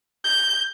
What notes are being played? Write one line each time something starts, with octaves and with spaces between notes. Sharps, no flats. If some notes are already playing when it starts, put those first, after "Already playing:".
G6